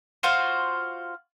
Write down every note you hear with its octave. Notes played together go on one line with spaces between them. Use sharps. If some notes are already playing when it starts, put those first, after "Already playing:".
F4 F#4 C5 F5